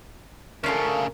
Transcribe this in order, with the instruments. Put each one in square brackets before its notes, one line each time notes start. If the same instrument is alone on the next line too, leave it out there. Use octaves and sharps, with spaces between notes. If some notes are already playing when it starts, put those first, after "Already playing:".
[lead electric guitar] D2 C#3 [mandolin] C#4 F4 A4 [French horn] A#4